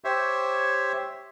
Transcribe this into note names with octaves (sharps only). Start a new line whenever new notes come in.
G4 C5 C#5 E5